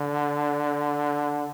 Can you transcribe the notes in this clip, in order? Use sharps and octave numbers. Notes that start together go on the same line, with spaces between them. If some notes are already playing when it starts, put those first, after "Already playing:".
Already playing: D3